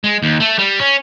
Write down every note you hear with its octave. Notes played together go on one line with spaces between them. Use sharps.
G#3
D#2
A3
G3
C#4